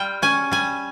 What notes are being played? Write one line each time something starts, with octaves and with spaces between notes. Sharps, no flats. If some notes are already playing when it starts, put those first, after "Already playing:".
Already playing: G3 F4 F5 G5
C#4 G#5
G3 G#5